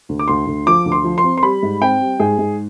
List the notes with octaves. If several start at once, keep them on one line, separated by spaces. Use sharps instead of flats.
D2
D6
D2 C6
D2
F3 D6
D2
C6
F3
C6
C4
C6
G3 B5
G#2
C4 G5
G3
G#2 G#4
G#2